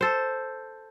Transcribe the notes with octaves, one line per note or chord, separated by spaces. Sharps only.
A4 C5